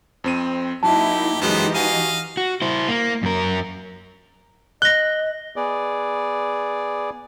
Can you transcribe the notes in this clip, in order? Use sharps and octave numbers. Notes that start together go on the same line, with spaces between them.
F2 C4 D#7
F#3 A#3 D#4 E4 G4 A5
F#2 E3 F#3 G#3 B3 D#4 G4 C5
F#4 D#5 F5 G#5 D#7
F#4
E4 C5
A#3
F#2 A#4
D#5 F#6 A#6 G7
B3 G#4 D5